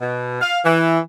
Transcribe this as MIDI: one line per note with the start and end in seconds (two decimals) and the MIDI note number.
0.01 0.40 47
0.42 0.60 77
0.65 1.00 52